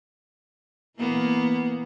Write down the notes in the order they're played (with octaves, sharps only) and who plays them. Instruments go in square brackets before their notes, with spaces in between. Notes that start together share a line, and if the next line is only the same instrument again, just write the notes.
[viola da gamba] E3 A#3 B3